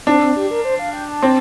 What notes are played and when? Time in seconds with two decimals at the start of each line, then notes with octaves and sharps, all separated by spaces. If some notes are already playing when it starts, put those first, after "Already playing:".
0.07 C4 D4
0.21 C4
0.36 G4
0.51 A#4
0.65 C5
0.79 F5
0.93 G5
1.09 A5
1.23 C4